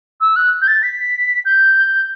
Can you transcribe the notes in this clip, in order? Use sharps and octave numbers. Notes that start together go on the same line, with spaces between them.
E6
F#6
G6
A6
B6
G6